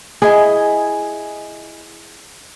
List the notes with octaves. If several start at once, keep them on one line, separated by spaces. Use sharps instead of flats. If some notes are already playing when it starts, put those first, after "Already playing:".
E4 G#4 D#5 G#5